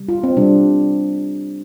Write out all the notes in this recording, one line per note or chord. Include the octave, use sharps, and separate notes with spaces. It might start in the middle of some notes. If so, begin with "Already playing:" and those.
Already playing: C3 G3
F4
C4
C3 G3 D4